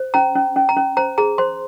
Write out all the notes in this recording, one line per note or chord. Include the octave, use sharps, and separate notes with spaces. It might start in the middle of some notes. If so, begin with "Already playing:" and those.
Already playing: C5
C#4 A#5
C#4
C#4
A#5
C#4
C5 A#5
G#4 A#5
C5 C6